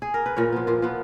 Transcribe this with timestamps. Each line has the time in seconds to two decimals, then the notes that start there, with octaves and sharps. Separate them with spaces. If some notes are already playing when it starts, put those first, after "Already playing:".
0.02 G#4
0.14 A#4
0.26 B4
0.36 A#2 A#4 C#5
0.53 F3 B3
0.67 A#2 F4
0.82 F3 B3